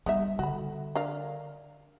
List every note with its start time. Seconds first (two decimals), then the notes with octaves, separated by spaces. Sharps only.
0.06 G3 B3 D#4 E5
0.39 D3 F#4 B5
0.95 D4 A#4 F5